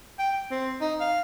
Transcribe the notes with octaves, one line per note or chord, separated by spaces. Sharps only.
G5
C4
D#4
F5